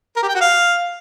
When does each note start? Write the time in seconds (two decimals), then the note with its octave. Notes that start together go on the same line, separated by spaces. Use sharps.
0.16 A#4
0.22 G4
0.28 G5
0.34 F#4
0.41 F5